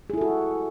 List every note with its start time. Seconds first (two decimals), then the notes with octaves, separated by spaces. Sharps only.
0.10 G#4
0.14 E4
0.17 A4
0.21 F#4